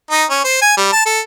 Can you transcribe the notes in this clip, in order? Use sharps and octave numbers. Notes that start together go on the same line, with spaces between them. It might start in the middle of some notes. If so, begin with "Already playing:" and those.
D#4
C#4
C5
G#5
G3
A5
A4